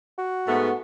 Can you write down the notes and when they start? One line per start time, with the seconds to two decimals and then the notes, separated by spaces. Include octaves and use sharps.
0.18 F#4
0.47 G#2 A3 B3